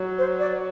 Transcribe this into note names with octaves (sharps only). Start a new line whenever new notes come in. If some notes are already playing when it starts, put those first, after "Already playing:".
Already playing: F#3
C5
D5